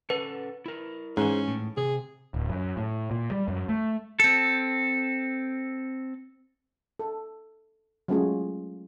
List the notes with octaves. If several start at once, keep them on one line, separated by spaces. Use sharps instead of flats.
C#4 A4 B4 F#5
E4 A#4
G#2 E3 C#4 G#4 C5
A2
C3 G#4
D1
F#2
A2
A#2
G3
F#2
A3
C4 A4
A4
F#3 G#3 A3 C#4 F4 G#4